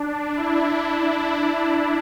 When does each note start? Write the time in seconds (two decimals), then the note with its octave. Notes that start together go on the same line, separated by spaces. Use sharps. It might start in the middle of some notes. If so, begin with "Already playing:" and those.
Already playing: D4
0.36 E4